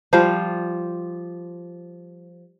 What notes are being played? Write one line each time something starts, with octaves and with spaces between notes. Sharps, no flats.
F3 G3 F4 C5